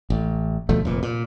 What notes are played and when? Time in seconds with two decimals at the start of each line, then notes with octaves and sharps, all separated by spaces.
0.10 A1
0.69 D2 B2 F3 A3
0.85 F1 A#2
1.03 A#2